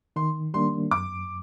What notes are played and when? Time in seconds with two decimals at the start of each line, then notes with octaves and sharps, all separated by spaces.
0.16 D#3 C6
0.54 G3 A#3 D4 C6
0.91 F#2 D6